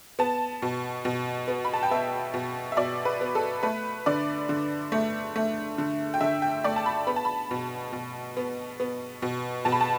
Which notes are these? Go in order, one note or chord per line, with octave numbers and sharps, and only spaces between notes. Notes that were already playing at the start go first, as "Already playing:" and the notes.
B3 A5
B2
B2
B3
B5
A5
G5
B3 E5
B2
E5
B2 D5
B4
B3
A4
A3 B4
D3 D5
D3
A3
A3
D3
G5
D3 E5
G5
A3 D5
A5
B5
B3 B5
A5
B5
B2
B2
B3
B3
B2
B2 A5
B5
A5